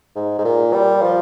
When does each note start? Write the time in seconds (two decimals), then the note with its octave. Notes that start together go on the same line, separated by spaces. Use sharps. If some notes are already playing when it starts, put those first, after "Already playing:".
0.15 G#2
0.39 G#2
0.44 A#2
0.73 G3
1.02 F3